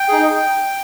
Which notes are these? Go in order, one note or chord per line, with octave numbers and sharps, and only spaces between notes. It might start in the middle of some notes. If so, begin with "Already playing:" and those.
Already playing: G5
D#4 G#4